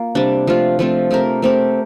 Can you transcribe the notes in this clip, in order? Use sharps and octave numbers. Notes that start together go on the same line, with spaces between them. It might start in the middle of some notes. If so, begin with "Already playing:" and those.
Already playing: A#3 F4
C3 G3 D4
F3 A3 C4 F4
F3 A3 C4 F4
A3 C4 G4 A#4
A3 C4 G4 A#4